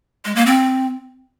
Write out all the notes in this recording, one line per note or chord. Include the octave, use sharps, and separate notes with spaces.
G#3
A#3
C4